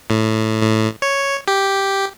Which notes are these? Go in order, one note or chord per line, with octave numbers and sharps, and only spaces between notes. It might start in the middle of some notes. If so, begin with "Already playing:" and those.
A2
A2
C#5
G4